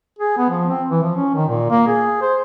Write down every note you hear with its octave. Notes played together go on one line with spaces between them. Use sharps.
G#4
B3
F3
C4
E3
F3
C#4
D#3
A#2
A#3
G#4
C5